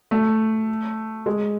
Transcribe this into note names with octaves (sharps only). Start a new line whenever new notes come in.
A3
G#3